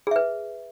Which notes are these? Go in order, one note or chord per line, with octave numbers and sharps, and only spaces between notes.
G#4 B4 E5